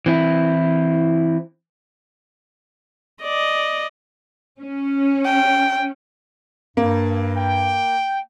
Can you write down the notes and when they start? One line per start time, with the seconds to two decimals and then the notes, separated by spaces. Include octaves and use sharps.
0.06 E3 C4 E4
3.23 D5 D#5
4.60 C#4
5.25 G5
6.77 G2 A#3
7.37 G5